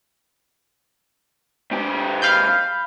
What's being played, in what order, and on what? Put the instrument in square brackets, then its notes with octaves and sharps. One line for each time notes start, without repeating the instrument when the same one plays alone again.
[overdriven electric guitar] G#2 G4
[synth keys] F5 B5 G6